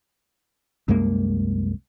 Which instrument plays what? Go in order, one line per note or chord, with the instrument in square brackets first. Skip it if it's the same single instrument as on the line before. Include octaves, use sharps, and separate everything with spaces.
[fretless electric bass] C2 F#2 G#3 A#3